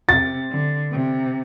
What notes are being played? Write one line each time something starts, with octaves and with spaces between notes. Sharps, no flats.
C3 A6
D3
C3